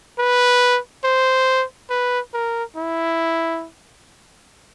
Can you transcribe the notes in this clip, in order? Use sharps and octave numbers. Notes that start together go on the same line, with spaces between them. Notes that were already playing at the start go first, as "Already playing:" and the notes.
B4
C5
B4
A#4
E4